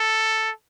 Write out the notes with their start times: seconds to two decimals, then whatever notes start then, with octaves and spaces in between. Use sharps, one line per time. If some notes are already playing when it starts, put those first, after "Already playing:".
Already playing: A4